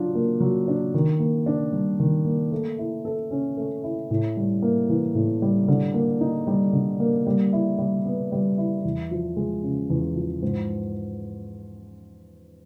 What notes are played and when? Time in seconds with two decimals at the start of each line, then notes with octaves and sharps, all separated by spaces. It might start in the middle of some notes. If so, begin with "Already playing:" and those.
Already playing: F#3 D4 F4
0.15 A#3
0.40 F#3
0.68 D4
0.94 D#3
1.19 A#3
1.46 D4
1.73 G3
1.99 D#3
2.25 A#3
2.52 A3
2.78 E4
3.05 A4
3.31 C#4
3.57 A3
3.84 E4
4.10 A2
4.37 G3
4.62 A#3
4.89 E3
5.15 A2
5.42 G3
5.68 D3
5.94 A#3
6.21 D#4
6.47 G3
6.73 D3
7.00 A#3
7.27 G3
7.53 E4
7.79 G3
8.05 B3
8.32 G3
8.58 E4
8.85 E2
9.11 F3
9.36 G#3
9.63 C#3
9.90 E2
10.16 F3
10.42 G#2